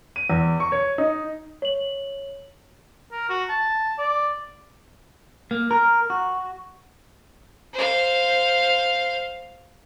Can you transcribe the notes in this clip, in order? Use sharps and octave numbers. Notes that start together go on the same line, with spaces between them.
D#7
E2
C#6
C#5
D#4
C#5 F#7
A#4
F#4
A5
D5
A#3
A#4
F#4
C5 F5